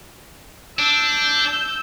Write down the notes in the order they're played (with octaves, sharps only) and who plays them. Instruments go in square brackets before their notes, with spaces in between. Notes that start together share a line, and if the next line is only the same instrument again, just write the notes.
[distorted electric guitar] D4 [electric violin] E6 G6